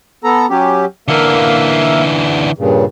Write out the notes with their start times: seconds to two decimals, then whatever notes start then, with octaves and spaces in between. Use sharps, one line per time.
0.24 B3 A4 A#5
0.50 F#3 C#4 G4
1.08 D3 E3 A#3 E5 F5
2.58 G2 A#2 C#3